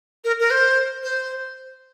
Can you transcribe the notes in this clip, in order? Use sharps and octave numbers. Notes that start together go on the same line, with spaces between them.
A#4
A#4
C5
C5